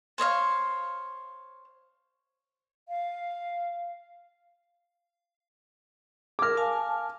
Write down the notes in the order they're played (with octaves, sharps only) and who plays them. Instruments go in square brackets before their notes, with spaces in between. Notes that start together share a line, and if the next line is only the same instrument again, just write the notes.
[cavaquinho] C5 C#5 D#5 F5
[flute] F5
[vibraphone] G#4 A#4 [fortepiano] D6 F6
[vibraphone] F5 G#5 A5